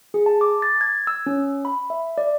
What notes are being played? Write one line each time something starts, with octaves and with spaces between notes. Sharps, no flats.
G#4
A5
D6
A6
G#6
E6
C#4
B5
E5
D5